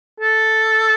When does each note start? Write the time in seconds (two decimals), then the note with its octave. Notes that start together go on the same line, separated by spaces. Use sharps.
0.20 A4